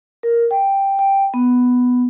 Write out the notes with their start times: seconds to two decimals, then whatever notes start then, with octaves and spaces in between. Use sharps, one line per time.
0.23 A#4
0.51 G5
0.99 G5
1.34 B3